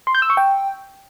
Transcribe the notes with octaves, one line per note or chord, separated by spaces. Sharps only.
C6
G6
E6
C#6
G5